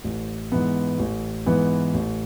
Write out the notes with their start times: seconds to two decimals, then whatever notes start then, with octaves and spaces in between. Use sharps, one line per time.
0.04 A1
0.52 G#2 E3 B3
0.99 A1
1.46 G#2 E3 B3
1.94 A1